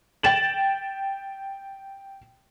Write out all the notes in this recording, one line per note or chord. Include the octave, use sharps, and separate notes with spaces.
G5 A6 E7 F#7